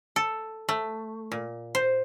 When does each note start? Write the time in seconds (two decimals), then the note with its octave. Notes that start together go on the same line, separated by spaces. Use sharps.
0.16 A4
0.69 A3
1.32 A#2
1.75 C5